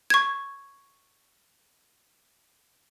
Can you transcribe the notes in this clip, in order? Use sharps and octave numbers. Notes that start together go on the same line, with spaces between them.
C#6 G#6